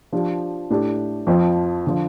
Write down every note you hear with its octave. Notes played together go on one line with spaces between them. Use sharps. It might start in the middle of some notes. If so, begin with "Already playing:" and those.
F3 D4 G4
A2 A3 D4 G4
F2 F3 C4
D3 F3